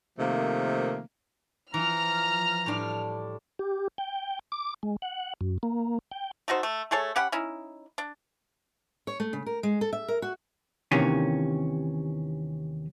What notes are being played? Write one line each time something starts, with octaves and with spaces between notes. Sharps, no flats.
C3 D#3 F3 A3 A#3
E3 F3 A#5 F6
A2 G3 D4
G4
G5
D6
G#3
F#5
F#2
A#3
G5
A3 D#4 F#4 C5
A3
A3 G#4 A4 C#5
C#4 G4 F#5 B5
C#4 D#4 E4
D4
C#5
A3
C#3
A#4
G#3
A4
E5
A#4
F#4
D#2 C3 D#3 E3 C#4